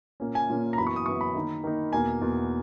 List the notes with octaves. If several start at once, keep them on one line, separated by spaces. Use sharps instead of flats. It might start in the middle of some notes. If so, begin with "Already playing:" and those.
A#2 A#3 C#4
G#5
A#2 A#3 C#4
A#5
F#2 E3 B3 B5
C#6
D#6
F#2 E3 B3 C#6
B5
D#3 A#3 D#4
D#3 A#3 D#4
E2 B2 A#3 G#5
E2 B2 A#3